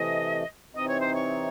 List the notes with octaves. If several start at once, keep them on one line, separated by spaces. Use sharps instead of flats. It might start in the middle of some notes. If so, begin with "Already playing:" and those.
Already playing: C3 E3 A3 D#5
C3 E3 C4 D#4 D#5
C#5
C5
C#5